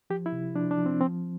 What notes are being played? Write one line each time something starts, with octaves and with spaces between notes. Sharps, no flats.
F3 G4
E4
C3
F3 D4
D4
F3
C4
F3 C4